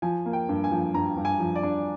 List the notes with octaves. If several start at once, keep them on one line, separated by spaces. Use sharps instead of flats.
F3 G#5
A#3
G5
G2
G#5
F3
G2 A#5
G2
G#5
F3
D5
D4